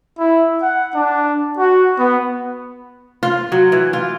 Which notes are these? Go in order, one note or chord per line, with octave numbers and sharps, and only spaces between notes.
E4
F#5
D4
F#4
B3
F4
F#3
E3
F4